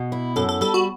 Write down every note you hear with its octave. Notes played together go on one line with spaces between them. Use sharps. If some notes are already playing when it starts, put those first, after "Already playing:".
Already playing: B2
E4
F#2 A4
A4
G3 A4
F#4